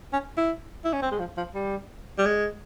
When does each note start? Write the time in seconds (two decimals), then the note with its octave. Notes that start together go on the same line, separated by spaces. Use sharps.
0.13 C#4
0.37 E4
0.85 E4
0.93 C#4
1.02 C4
1.11 G#3
1.19 F3
1.37 F3
1.55 G3
2.18 G3
2.26 G#3